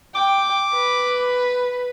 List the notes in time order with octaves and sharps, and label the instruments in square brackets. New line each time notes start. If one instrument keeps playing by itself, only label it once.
[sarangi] G5 [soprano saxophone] D6
[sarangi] B4